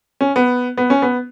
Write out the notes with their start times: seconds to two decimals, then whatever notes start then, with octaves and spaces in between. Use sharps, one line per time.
0.21 C#4
0.36 B3
0.77 B3
0.90 C#4
1.02 B3